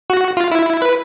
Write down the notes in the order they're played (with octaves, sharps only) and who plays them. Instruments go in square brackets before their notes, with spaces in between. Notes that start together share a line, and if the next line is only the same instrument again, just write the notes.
[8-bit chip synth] F#4
F4
E4
B4